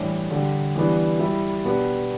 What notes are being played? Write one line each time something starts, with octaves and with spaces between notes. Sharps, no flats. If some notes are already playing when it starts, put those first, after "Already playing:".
Already playing: A2 E3 G3 D4 G4
D3 G3 D4 G4
E3 G3 B3 D4
G3 E4 G4
B2 B3 D4 G4